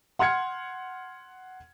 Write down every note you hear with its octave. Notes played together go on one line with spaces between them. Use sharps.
F#5 C6 F6 G#6 C#7